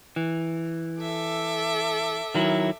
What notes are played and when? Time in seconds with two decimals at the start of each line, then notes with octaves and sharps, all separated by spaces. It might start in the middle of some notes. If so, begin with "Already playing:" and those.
0.16 E3
1.01 A4 E5 D6
2.35 D#3 F#3 E4